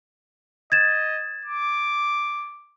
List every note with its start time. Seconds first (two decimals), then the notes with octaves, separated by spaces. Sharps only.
0.72 D#5 G#6 A6 E7
1.45 D6